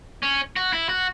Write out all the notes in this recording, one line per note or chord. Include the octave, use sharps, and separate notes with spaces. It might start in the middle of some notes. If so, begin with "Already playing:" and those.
C#4
F#4
E4
F#4